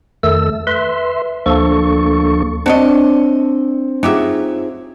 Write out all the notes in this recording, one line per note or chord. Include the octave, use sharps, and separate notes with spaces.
F2 D#3 A3 A4 E6
B4 E5 C6
D2 F3 A#3 D4 A4 C#6
C4 D4 F#4 C#5 D#5
F#3 D#4 F4 G4 G#4 E5